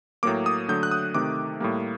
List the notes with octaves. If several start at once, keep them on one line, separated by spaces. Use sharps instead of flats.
A2 F#3 A#3 D6
D#6
D3 F#3 A3 G6
F#6
D#6
C3 D#3 A3 D6
A2 G3 A#3